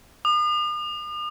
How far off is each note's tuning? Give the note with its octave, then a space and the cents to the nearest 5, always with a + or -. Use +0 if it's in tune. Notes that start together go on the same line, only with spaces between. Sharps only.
D#6 -45